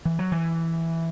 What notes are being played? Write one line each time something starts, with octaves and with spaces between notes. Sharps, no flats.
E3
F#3
E3